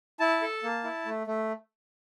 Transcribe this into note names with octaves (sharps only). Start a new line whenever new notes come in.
E4 A5
A4
A#3
E4
A3
A3